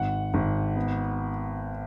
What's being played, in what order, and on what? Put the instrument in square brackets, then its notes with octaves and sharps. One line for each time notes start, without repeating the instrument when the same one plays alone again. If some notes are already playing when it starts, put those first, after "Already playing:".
Already playing: [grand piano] G#1 F#5
G#1
B3